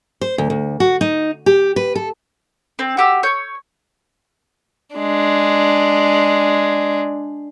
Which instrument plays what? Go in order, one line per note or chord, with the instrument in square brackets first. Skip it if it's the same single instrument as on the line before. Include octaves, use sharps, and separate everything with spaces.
[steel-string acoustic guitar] C5
D2
D2
F#4
D#4
G4
B4
A4
[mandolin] C4
F#4 G4 E6
C#5 G6
[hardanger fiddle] G#3 D4